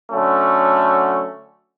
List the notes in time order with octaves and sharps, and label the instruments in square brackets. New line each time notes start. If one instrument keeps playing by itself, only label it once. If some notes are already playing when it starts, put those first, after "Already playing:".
[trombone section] D3 F#3 A3 C#4